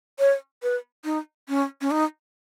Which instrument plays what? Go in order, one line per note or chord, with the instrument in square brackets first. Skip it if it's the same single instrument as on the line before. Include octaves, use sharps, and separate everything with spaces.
[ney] C#5
B4
D#4
C#4
C#4
D#4